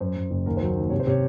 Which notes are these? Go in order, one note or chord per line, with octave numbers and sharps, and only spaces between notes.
F#2 C5
F#2
F#1
D#2 A#4
F#3 C5
D#3
C3 C#5
C5
C3 C#5